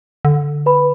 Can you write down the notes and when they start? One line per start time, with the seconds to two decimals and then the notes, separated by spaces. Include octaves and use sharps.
0.25 D3
0.66 B4 B5